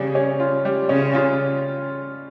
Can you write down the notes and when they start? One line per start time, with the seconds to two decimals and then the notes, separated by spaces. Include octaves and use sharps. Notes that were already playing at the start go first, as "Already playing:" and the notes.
Already playing: C#3 G3
0.15 C#4
0.40 F4
0.65 G3
0.89 C#3 C#4
1.15 F4